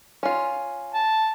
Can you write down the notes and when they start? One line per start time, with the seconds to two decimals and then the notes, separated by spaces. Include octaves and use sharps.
0.23 C#4 F4
0.94 A5